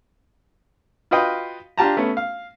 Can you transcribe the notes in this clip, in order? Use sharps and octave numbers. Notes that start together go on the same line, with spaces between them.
F4 F#4 B4 D#5 F5 G5
D4 F4 G4 A5 A#5
A3 B3 C#4
F5